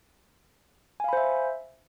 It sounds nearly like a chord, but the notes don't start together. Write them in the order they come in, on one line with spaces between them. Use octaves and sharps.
G#5 F5 B5 C5 E5